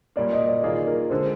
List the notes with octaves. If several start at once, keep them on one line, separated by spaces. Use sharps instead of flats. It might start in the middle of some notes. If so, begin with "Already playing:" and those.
A#2 G3 A#3 D5
D#5
D5
D#3 A#3 F4 G#4 D5
A#4
D3 G#3 D4 C5